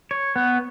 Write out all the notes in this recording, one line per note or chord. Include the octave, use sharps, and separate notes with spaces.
C#5
B3